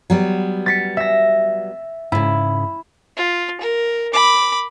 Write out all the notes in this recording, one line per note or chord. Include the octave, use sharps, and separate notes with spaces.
F#3 G3 B3
A6 B6 C#7
E5 A#6
G#2 C#3 E4
F4
A#4
B5 D6